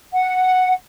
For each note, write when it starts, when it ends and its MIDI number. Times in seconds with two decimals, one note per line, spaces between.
0.13 0.73 78